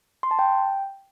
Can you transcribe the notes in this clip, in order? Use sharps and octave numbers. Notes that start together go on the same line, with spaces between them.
C6
A5
G5